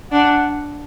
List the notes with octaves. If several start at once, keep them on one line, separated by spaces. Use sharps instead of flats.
D4 F#5